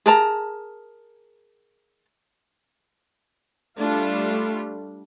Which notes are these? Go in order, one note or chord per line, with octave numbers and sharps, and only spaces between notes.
G#4 A#4 A5 A#5
G3 A3 D4 F4